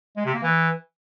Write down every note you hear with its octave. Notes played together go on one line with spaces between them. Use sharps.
G#3
C3
A#3
E3